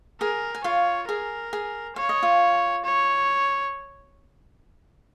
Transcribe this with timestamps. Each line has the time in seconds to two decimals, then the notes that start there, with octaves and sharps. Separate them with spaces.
0.21 G#4 A#4 G#5
0.55 G#5
0.64 F4 C#5 F5
1.08 G#4 A#4 G#5
1.53 G#4 G#5
1.96 C#5 F5
2.09 D#5
2.22 F4 F5
2.84 C#5